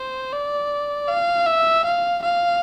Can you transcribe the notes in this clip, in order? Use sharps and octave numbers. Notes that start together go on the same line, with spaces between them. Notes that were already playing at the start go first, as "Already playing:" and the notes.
Already playing: C5
D5
F5
E5
F5
F5